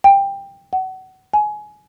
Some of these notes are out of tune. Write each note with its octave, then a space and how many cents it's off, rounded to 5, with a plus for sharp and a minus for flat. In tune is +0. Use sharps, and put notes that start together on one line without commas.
G5 +15
F#5 +30
G#5 +20